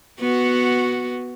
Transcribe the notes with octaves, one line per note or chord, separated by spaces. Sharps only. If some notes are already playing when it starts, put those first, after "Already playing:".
B3 F#4